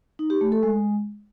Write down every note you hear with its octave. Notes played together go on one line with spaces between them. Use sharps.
D#4
G4
A3
A4
G#3